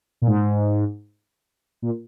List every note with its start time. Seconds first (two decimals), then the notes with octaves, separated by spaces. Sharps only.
0.22 A#2
0.27 G#2
1.82 A#2